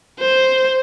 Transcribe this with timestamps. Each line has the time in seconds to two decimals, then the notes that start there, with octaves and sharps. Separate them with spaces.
0.20 C5